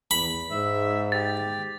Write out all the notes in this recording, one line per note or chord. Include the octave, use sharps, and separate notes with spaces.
E2 B5
G#2 E5
G4 A6